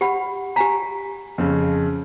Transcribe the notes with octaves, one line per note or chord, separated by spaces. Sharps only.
G4 F#5 B5
G4 G#5 A#5 B6
F2 C#3